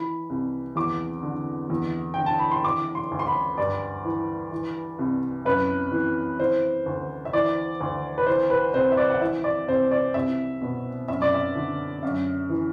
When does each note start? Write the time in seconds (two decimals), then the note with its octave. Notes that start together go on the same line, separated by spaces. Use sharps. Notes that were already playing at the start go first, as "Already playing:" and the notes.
Already playing: E3 B5
0.30 C2
0.76 E2 D6
1.23 D3
1.70 E2
2.14 D3 G5
2.26 A5
2.39 B5
2.51 C6
2.64 E3 D6
2.95 C6
3.11 D2
3.19 C6
3.27 B5
3.57 G2 D5
4.05 E3
4.52 E3
4.99 C2
5.45 F#2 B4
5.92 E3
6.39 E3 C5
6.86 D2
7.25 E5
7.33 E3 D5
7.80 D2
8.18 B4
8.27 E3 C5
8.50 B4
8.74 C2 C5
8.92 E5
8.97 D5
9.10 F#5
9.21 E3 E5
9.44 D5
9.68 C2 C5
9.91 D5
10.14 C2 E5
10.62 B2
11.08 F#2 E5
11.22 D5
11.34 E5
11.55 D3
12.03 F#2
12.50 E3